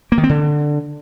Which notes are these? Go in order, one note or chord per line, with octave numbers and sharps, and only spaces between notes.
A#3
D#3
C4
D3